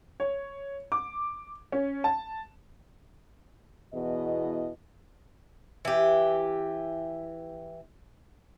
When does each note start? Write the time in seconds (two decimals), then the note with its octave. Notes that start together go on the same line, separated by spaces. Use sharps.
0.20 C#5
0.92 D6
1.72 C#4
2.04 A5
3.93 E2 B2 E4 D#5
5.85 E3 G4